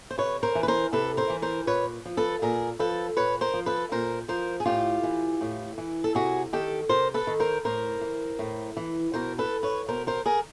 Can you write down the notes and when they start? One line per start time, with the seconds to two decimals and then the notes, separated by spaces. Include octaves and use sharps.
0.11 C5
0.18 C3 B4 C#5
0.43 A#4 C5
0.55 E3
0.63 B4
0.68 A#4 C5
0.93 C3 A4 B4
1.17 A#4 C5
1.30 E3
1.42 A#4 C5
1.67 A#2 B4 C#5
2.05 F3
2.17 A4 B4
2.42 A#2 G#4 A#4
2.79 F3 A4 B4
3.17 A#2 B4 C#5
3.41 A#4 C5
3.54 F3
3.66 A4 B4
3.92 A#2 A#4 C5
4.28 F3 A#4 C5
4.60 G#4
4.66 A2 F4 G4
5.03 E3
5.41 A2
5.78 E3
6.04 A4
6.15 C3 F#4 G#4
6.53 D#3 G4 A4
6.89 C3 A#4 C5
7.14 A4 B4
7.27 D#3
7.40 A#4 C5
7.65 A2 A#4 C5
8.01 E3
8.39 A2
8.77 E3
9.14 B2 A#4 C5
9.39 A4 B4
9.63 B4 C#5
9.88 B2 A#4 C5
10.07 A#4 C5
10.26 G#4 A#4